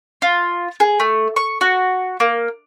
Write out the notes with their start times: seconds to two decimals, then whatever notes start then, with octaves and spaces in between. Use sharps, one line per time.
0.22 F4
0.80 G#4
1.00 A3
1.36 C#6
1.61 F#4
2.20 A#3